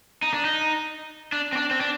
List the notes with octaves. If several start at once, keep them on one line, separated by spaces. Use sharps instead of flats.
D#4
D4
D#4
D4
C4
D4
C4
D4